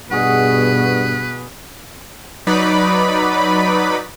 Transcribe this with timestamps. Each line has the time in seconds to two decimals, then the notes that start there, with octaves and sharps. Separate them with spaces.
0.11 G2 B2 F#4 G#4 B4 D#5
2.47 F#3 D#4 B4 D5 B5